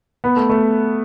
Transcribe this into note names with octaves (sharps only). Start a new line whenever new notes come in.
B3
A3
A3